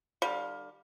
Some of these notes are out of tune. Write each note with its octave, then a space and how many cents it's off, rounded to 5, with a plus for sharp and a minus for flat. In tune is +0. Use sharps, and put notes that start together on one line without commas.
D3 +40 G3 +0 F5 +15